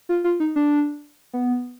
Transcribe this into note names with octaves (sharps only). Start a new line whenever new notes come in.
F4
F4
D#4
D4
B3